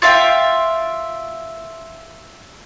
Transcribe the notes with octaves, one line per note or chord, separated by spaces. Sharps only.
F4 E5 F5 G5